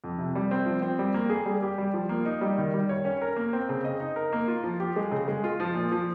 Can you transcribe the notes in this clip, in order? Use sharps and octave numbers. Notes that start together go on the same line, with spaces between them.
F2
C3
G3
C4
F3
C4
G3
A#3
G#4
G3
G4
G3
F3
A#3
D#4
G3
D#3
G3
C#5
C#4
A#4
A#3
C4
C#3
D#5
D#4
A#4
A#3
F4
F3
G4
G#3
C#3
G#3
F4
F3
A#2
F3